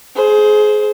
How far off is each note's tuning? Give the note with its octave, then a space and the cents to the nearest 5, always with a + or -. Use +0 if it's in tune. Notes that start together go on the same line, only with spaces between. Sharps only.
G#4 +25 C5 +0